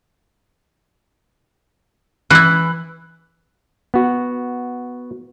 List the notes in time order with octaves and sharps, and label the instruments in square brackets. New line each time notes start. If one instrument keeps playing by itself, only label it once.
[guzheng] E3 E4 [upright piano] F#6
[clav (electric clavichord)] B3 F#4